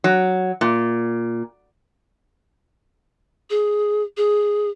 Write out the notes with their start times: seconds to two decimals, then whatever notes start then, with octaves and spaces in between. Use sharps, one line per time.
0.04 F#3
0.61 A#2
3.50 G#4
4.17 G#4